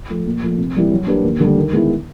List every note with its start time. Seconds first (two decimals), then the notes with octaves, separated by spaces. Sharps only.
0.09 F3 A3
0.26 A#2
0.42 F3 A3
0.58 C3
0.75 E3 G3 A#3
0.91 F#3
1.07 A#3 D4 G4 B4
1.24 D#2
1.40 D3 G3
1.56 D#3
1.73 G#3 B3 E4